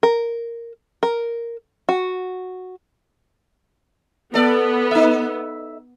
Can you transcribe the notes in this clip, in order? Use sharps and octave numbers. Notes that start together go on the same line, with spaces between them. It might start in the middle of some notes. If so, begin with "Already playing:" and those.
A#4
A#4
F#4
B3 A4 D5
D#4 E5